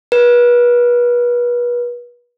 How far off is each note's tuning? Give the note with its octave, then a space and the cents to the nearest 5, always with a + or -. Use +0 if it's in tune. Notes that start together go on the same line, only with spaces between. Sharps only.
B4 -35